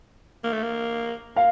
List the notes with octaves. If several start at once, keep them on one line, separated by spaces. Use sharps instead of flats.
A#3
A3
A#3
A#3 F5